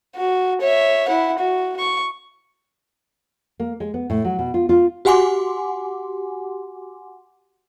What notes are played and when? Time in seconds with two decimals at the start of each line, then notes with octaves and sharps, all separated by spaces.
0.16 F#4
0.61 C#5 E5
1.08 E4 F#5
1.39 F#4
1.79 C#6
3.60 A#3
3.80 G#3
3.94 B3
4.10 A2
4.25 F#3
4.39 B2
4.54 F4
4.69 F4
5.05 F#4 G4 F#5 G#5 C6 D6